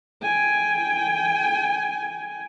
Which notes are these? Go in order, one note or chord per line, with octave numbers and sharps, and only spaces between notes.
G5 G#5